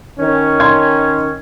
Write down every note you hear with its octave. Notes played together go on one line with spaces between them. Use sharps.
D#3 C#4
C6 G#6